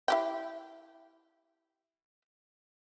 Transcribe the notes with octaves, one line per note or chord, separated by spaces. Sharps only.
E4 G4 G5